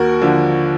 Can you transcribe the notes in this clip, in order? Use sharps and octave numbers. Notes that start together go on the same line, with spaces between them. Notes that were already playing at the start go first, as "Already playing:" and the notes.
Already playing: D#2 F#4 A#4
D3 F3